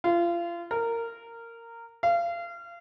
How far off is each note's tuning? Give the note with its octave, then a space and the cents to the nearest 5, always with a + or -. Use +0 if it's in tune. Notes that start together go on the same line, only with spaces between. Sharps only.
F4 -30
A#4 -15
F5 -30